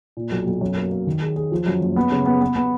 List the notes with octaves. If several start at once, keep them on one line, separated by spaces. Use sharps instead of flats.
A#2
B1
B1
F#2
A#3
A#3
D#3
G#4
G#4
F3
F#2
F#1
B3
C#3
B3
B3
B3